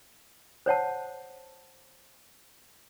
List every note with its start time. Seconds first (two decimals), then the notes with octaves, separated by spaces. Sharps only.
0.66 C5 C#5 F#5 A5